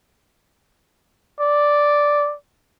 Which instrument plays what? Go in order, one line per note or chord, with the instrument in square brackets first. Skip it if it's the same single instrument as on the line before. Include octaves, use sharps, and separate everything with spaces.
[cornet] D5